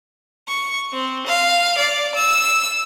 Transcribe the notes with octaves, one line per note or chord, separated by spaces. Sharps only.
C#6
C4
F5
D5
E6